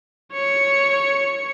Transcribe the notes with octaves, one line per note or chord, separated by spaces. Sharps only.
C#5 C#7